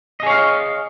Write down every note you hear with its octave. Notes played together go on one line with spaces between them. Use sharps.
G#4 C#5 D#5 F5